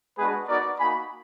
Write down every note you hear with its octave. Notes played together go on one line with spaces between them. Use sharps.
G#3 B3 D4 F#4 G#4 B4
B3 D#4 F#4 A#4 D5
A#3 D#4 F#4 G#5 B5